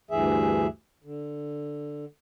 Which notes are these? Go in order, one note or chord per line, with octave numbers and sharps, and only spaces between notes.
D2 G2 E3 G#4 E5
D3